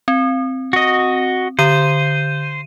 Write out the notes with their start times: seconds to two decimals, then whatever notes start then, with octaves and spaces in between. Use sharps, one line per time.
0.08 C4
0.73 F#4 D#5
1.59 D3 C5 D#7